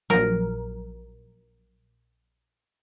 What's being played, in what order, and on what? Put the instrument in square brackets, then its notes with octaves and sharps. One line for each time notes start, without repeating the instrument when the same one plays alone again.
[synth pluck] A#1 F3 F#3 [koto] A#4